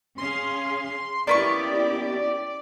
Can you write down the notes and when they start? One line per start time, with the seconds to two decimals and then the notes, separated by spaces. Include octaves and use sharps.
0.18 C#4 G#4 F5 C6
1.27 A#3 B3 C#4 E4 G4 D5 C#6